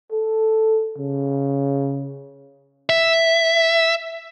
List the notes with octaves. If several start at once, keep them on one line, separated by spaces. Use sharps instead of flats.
A4
C#3
E5